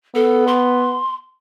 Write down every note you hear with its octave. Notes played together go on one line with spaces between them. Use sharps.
B3 A4
C6